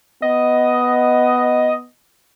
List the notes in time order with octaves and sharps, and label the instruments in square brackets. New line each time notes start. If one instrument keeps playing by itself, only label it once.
[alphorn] B3 [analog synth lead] D#5